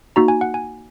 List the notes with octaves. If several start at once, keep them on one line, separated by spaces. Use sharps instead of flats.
A#3 D#4 F#4 A#5
G#5
F#5
G#5